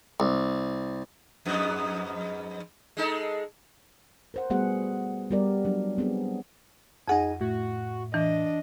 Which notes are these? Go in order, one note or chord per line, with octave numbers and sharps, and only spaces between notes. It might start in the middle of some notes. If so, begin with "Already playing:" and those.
C2
F2 G#2 B3
G#3 D#4 A4
A#4 C5 F#5
G3 A3 B3 F#4 G#4 F#5
G3 B3 G4 A#4 D5
F#3 D4
B3 C4 D4 G#4
F2 D#4 G#4 F#5 G#5
A2 F#4
E3 D4 D#5